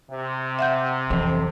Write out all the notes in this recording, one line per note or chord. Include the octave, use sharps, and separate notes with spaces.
C3
E5 F#5 G6
F2 E3